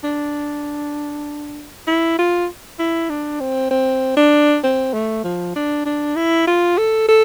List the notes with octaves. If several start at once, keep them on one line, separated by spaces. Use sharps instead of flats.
D4
E4
F4
E4
D4
C4
C4
D4
C4
A3
F3
D4
D4
E4
F4
A4
A4